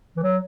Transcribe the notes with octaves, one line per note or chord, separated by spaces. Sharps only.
E3
F#3